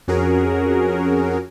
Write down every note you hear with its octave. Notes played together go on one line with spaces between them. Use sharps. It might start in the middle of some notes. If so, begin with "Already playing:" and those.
F2 C#4 F#4 G#4 A#4